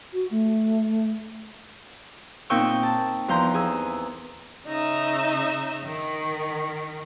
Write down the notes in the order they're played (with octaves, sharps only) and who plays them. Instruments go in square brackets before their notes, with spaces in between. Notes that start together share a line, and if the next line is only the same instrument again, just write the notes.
[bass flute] F#4
A3
[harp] A#2 C4 D#4 G5 C#6 E6
A5
E2 F3 A#5 C6 G6
G#4 E6
[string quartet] C#3 D#4 D#5 E5
D#3